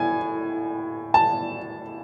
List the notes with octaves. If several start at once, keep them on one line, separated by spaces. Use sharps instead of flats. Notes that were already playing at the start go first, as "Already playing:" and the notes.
Already playing: A2 G#5
A5